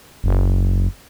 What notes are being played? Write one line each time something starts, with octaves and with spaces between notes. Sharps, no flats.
F#1